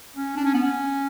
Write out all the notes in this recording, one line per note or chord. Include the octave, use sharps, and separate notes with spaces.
C#4
D4
C#4
B3
C#4